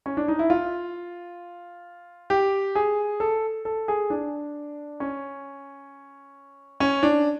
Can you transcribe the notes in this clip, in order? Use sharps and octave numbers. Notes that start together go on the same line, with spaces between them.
C#4
D4
D#4
E4
F4
G4
G#4
A4
A4
G#4
D4
C#4
C#4
D4